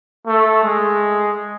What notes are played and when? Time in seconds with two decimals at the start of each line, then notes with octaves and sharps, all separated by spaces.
0.26 A3
0.63 G#3